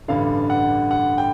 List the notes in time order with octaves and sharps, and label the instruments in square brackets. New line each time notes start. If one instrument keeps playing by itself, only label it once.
[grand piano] A1 G2 D3 F5
F#5
F#5
G5